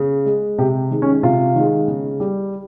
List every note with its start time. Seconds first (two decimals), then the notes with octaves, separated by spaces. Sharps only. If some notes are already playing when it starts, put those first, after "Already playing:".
Already playing: C#3
0.26 G#3
0.58 C3 G4
0.91 D#3 G#3
1.02 C#4
1.23 C3 F4
1.55 D#3 G#3
1.88 C#3
2.20 G3